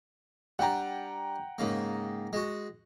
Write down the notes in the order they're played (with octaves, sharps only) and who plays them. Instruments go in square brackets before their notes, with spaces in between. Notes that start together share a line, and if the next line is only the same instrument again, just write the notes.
[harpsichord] G3 D4 [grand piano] F#5 G5 A#5
[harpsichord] G#2 C#3 A#3
G#3 F#4